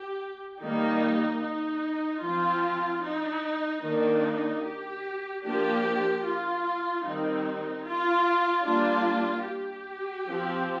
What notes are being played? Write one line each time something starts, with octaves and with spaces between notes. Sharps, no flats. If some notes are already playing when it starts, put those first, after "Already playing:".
Already playing: G4
D#3 G3 A#3 D#4
D#4
F3 C4 F4
D#4
D#3 A#3 D4 D#4
G4
F3 A#3 D4 G4
F4
D#3 G3 C4 D#4
F4
G3 A#3 D4 F4
G4
F3 C4